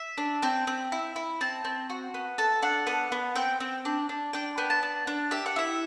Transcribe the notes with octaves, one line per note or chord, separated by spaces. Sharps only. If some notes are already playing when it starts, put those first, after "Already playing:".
Already playing: E5
D4
C4 G5
C4
E4
E4
C4 A5
C4
F#4
B3
A4 A5
D4 F#5
B3 F#5
B3
C4 G5
C4
D4
D4
D4 G5
B3 G5
A5
D4
D4
G4 E5
F#5
E4 E5